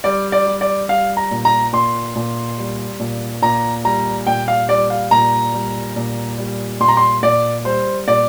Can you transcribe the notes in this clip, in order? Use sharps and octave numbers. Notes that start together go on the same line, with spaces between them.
G3 D5
D5
G3
D5
G3 F5
A#5
A#2
A#5
A#2 C6
A#2
G3
A#2
A#2 A#5
G3 A#5
A#2 G5
F5
G3 D5
F5
A#2 A#5
G3
A#2
G3
A#2 C6
A#5
C6
A#2 D5
G3 C5
A#2 D5